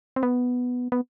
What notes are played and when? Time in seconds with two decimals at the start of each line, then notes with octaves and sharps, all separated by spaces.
0.16 C4
0.23 B3
0.92 B3